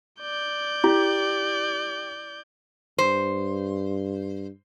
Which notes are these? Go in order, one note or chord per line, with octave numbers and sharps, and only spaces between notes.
D5 G6
E4 G4
G2 C5